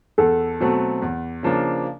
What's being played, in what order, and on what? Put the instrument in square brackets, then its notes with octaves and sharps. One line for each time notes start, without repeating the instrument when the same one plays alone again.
[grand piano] E2 [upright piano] A4
[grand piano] B2 F#3 A3 C4
E2
C#3 F3 A#3 D4